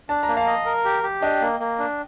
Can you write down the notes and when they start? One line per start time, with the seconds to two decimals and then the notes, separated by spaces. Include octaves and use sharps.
0.09 D4 A5
0.23 A#5
0.28 A#3
0.37 F5 A5
0.47 D#5
0.66 A#4
0.85 G4
1.03 G4
1.22 D4 D#5 G5
1.41 A#3
1.60 A#3
1.79 D4